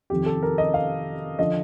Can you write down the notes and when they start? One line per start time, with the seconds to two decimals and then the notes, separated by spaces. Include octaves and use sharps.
0.10 F2 C3 D#3 G4
0.26 A4
0.43 A#4
0.58 D#5
0.74 F5
1.39 D3 F3 D#5